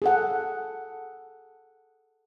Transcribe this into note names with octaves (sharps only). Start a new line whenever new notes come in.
G#4 A4 F#5